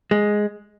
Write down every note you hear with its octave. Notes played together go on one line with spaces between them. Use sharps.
G#3